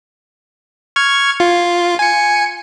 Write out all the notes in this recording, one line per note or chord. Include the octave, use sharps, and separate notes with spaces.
C#6 F6 G#6
F4
G#5 C#7